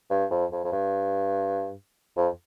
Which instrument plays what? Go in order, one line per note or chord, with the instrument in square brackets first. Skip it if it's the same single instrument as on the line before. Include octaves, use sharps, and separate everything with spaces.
[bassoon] G2
F2
F2
F2
G2
F2